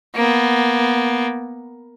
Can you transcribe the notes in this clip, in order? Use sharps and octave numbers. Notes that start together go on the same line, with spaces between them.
A#3 B3